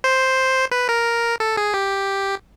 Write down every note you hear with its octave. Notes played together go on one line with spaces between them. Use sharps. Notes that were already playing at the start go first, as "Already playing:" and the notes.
C5
B4
A#4
A4
G#4
G4